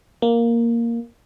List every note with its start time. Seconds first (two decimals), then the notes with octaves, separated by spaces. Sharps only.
0.22 A#3